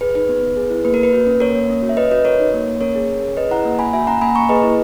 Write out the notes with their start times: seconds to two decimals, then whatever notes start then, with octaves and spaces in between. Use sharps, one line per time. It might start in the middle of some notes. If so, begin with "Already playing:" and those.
0.01 G#4 B4
0.15 D#4 B4
0.29 B3
0.43 B3
0.56 G#4
0.70 E4
0.85 A#3 B4
0.94 A#4
0.99 A#3 B4
1.13 F#4
1.27 C#4
1.40 A#3 A#4 C#5
1.55 A#3
1.70 C#4
1.82 F#4
1.89 E5
1.97 C#4 B4 D#5
2.11 F#4 B4 D#5
2.25 F#4 A#4 C#5
2.39 D#4
2.54 A#3
2.67 A#3
2.81 C#4 A#4 C#5
2.95 G#4
3.10 C#4
3.23 G#4
3.37 G#4 B4 D#5
3.51 E4 F#5 A#5
3.65 A#3
3.79 A#3 G#5 B5
3.93 F#4 E5 G#5
4.07 C#4 F#5 A#5
4.21 A#3 G#5 B5
4.35 A#3 A#5 C#6
4.49 G#4 B4 D#5
4.63 E4